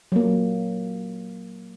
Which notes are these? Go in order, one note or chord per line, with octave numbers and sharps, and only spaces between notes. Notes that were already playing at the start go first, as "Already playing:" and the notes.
F#3 A#3